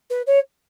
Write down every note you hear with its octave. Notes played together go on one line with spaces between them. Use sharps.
B4
C#5